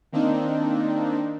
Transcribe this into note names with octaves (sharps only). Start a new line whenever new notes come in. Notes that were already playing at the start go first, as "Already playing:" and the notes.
D#3 A#3 C4 D4 D#4